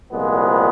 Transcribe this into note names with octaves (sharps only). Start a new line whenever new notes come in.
C2 A#2 F3 G#3 B3